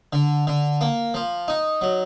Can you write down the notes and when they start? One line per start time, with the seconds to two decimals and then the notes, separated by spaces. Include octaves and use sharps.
0.13 D3
0.47 D3
0.81 A#3
1.14 F3
1.48 D#4
1.82 F#3